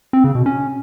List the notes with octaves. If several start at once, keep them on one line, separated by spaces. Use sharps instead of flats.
C4
C#3
B2
C#4